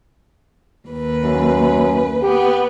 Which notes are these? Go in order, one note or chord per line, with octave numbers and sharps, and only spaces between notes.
D#2 B4
F#2
B3 G4